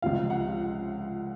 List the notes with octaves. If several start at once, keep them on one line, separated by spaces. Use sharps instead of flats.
C#2 C3 F3 F5
F#5